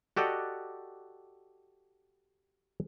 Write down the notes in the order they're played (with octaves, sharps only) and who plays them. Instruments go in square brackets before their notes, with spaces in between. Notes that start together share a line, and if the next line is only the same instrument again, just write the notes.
[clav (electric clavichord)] F#4 G4 A4 D5 D#5 F#5